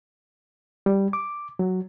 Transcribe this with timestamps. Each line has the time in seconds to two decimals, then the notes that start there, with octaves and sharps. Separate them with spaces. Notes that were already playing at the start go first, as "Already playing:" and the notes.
0.86 G3
1.13 D6
1.59 F#3